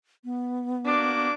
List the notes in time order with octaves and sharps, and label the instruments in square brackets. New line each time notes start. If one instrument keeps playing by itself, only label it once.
[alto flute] B3
[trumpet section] A#3 F#4 D6 [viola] D4